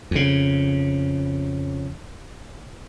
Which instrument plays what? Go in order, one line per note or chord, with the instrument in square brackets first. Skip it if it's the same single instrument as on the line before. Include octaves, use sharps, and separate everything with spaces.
[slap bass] F2 C#3